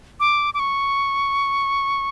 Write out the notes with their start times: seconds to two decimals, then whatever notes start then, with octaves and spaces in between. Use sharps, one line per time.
0.20 D6
0.54 D6
0.60 C#6